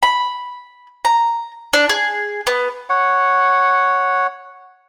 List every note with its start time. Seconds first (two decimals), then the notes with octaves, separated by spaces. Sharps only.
0.03 B5
1.05 A#5
1.73 D4
1.89 G#4
2.47 B3
2.90 C#5 F#5